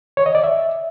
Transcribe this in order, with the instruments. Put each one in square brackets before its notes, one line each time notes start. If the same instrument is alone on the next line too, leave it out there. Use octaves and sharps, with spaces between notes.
[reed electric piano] C#5
D#5
D5
E5